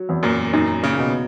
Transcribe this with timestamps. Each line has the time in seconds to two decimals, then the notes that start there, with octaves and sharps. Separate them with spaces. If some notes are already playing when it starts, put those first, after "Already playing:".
Already playing: F#3
0.09 E2
0.23 F#2 A#2
0.53 F#2 A#2 D#4
0.83 A#2 C#3
0.98 B2